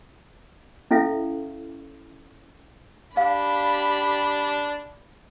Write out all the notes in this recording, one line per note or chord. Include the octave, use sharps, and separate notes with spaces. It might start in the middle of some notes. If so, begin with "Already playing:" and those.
C#4 E4 A4 E5 F5
D4 G4 F5 B5